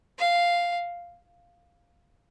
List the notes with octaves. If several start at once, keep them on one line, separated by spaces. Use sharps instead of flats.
F5